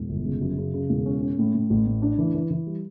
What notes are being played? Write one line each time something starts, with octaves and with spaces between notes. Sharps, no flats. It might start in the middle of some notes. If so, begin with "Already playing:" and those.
Already playing: E1
G1
C#3
F#2
C#3
C#3
E1
C#4
C#4
A2
A2
A1
A2
D4
E3
E3
E3
G3